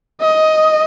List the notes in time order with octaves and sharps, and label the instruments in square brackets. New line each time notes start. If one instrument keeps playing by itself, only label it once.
[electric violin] D#5